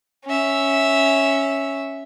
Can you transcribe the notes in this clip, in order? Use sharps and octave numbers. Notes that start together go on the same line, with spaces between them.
C#4 E5